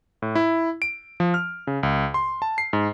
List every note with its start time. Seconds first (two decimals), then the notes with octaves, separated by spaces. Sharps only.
0.22 A2
0.35 E4
0.82 D7
1.20 F3
1.34 F6
1.67 C#3
1.83 C#2
2.14 C6
2.42 A5
2.58 C7
2.73 G#2